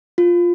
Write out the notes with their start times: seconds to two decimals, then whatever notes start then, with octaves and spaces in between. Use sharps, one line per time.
0.18 F4